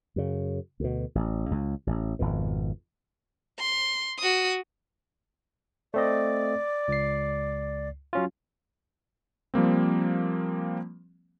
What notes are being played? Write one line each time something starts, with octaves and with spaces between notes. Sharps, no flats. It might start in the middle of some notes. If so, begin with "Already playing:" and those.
F#2 C#3
D2 B2
A1
C#2
A1
G#1 F2 B2
C6
F#4 D#6
A3 C4 D5 D#5
C#2 C7
F#3 C#4 F4
F3 G3 A#3 C4